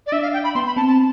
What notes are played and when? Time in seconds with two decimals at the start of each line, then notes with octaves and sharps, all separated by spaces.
0.07 D5
0.12 D4 E5
0.23 F5
0.33 G5
0.44 B5
0.55 B3 C6
0.66 B5
0.77 C4 A5
0.88 A5